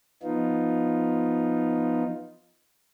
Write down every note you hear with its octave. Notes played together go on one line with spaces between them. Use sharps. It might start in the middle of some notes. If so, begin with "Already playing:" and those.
F3 B3 D#4 F4